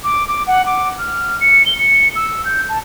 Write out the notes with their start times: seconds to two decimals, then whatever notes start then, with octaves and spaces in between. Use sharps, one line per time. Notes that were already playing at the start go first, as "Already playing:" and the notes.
0.04 D6
0.28 D6
0.47 F#5
0.66 D6
0.99 F6
1.41 C#7
1.66 G7
1.78 C#7
2.16 E6
2.45 G6
2.69 A5